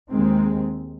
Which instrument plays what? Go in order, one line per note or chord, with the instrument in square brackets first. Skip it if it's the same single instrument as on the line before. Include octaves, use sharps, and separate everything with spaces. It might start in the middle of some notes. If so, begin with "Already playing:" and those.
[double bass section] D#2 D#3 G#3 C4